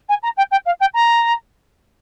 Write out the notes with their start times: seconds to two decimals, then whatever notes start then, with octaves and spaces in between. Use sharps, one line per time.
0.08 G#5
0.22 A#5
0.36 G5
0.51 G5
0.65 F5
0.80 G5
0.94 A#5